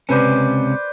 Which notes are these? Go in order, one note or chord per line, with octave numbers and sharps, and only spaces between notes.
C#2 C3 C#4 B4 C5 D5